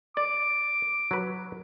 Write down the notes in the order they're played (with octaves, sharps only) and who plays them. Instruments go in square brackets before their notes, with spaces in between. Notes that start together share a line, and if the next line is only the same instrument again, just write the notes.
[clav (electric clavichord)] D5 [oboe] D6
[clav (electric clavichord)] F#3 B4